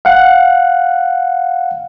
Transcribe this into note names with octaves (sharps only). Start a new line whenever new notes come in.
F5 F#5